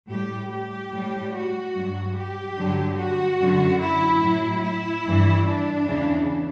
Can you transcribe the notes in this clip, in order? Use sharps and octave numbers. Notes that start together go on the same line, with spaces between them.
A2 G3 G4
G4
A2 G3
F#4
G2 F#3
G4
G2 D3 F#3
F#4
F#2 D3 F#3
E4
A2 F#3
E4
G2 E3 G3
D4
E2 C#3 E3